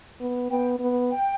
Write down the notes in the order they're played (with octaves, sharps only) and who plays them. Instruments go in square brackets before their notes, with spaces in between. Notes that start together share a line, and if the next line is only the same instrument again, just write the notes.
[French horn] B3
[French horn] B3 [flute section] G5
[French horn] B3
[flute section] G5